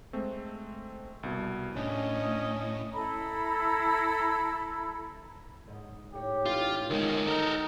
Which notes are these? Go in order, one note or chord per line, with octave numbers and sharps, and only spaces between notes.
G#3 A3 C4
C2 B2
A2 C#4 D4 D#5
E4 A4 A#5 B5
G#2 D#5
A2 D#4 G4 C#5
A1 F4
D2 D#3 G#3 B3 A5 A6
D#4 A4 A#4